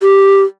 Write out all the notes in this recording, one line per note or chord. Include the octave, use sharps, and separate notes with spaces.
G4